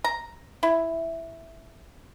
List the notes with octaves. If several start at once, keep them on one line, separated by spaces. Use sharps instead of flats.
A#5
E4